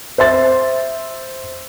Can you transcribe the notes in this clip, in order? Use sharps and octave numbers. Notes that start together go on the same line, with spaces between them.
C5 E5 C6 A6